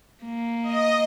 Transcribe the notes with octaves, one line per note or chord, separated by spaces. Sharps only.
A#3
D#5